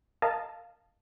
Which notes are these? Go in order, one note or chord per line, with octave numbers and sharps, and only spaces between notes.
A#4 D#5 F5 A5